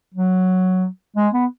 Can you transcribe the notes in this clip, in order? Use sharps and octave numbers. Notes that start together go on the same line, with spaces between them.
F#3
G#3
B3